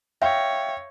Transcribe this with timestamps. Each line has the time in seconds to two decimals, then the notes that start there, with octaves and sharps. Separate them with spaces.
0.22 C#5 E5 F5 G5